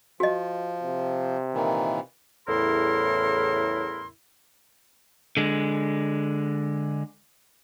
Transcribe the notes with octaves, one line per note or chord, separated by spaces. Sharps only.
F3 F#4 D#5
C3
A#2 D#3 E3
E2 A2 C#3 E4 A#4 C6
D3 G#3